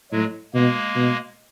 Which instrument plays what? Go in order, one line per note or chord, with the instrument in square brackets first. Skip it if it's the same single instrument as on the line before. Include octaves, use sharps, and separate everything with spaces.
[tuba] A2 [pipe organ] F#3 G#3
[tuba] B2 [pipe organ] G#3 A#3
[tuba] B2